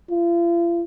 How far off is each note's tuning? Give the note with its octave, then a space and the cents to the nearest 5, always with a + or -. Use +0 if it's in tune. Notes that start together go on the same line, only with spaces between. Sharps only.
F4 -40